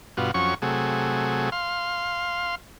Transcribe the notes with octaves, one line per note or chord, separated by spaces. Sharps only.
G2 B2 F4 F#4
F2 F#3 C#4 C#6
C3 F#3 A3 G#4
F5 C6